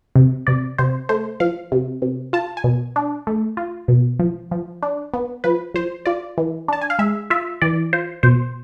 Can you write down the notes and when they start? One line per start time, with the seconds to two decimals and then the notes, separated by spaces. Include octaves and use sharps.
0.16 C3
0.47 C3 D5
0.78 C3 C5
1.09 A3 C5
1.40 F3 F5
1.72 C3
2.02 C3
2.33 F4 A5
2.57 G#5
2.64 B2
2.96 D4
3.27 A3
3.57 F4
3.88 B2
4.19 F3
4.51 F3
4.82 D4
5.14 B3
5.44 F3 B4
5.74 F3 C5
6.06 F4 D5
6.38 E3
6.68 D4 A5
6.81 G#5
6.90 F5
6.99 G#3 E5
7.30 F4 E5
7.62 E3 D5
7.93 F4 C5
8.23 B2 C5